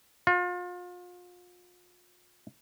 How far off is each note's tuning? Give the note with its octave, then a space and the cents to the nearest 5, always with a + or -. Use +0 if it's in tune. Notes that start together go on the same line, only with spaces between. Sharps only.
F4 +35